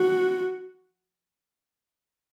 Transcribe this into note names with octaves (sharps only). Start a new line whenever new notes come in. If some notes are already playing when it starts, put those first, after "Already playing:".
Already playing: F#4